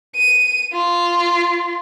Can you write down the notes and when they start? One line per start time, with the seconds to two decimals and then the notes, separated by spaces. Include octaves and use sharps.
0.15 D#7
0.73 F4